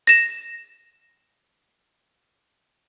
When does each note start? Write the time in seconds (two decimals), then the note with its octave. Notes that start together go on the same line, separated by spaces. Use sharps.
0.07 A#6 E7